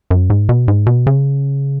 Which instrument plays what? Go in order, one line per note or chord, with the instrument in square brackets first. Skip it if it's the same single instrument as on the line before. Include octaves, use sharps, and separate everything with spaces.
[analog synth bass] F#2
G#2
B2
G#2
B2
C#3